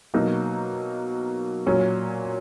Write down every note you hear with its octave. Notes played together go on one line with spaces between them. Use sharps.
B2 F#3 A#3 D#4
A#2 F#3 C#4